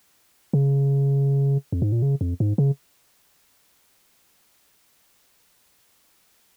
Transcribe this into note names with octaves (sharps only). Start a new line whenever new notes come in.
C#3
F2
G#2
A#2
C#3
F2
G#2
C#3